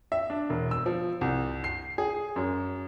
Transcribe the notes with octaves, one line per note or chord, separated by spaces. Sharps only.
E5
D4
E1
E6
F3
C2
C7
G#4
F#2